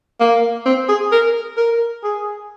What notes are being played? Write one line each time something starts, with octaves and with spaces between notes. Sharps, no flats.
A#3
C4
G#4
A#4
A#4
G#4